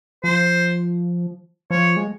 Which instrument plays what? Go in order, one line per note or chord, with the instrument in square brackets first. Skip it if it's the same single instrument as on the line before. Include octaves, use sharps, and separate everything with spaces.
[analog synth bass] F3 [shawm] C5
[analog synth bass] F3 [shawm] C#5
[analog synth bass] G#3